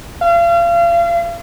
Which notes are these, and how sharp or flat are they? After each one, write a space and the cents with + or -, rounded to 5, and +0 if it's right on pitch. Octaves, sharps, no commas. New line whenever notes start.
F5 -35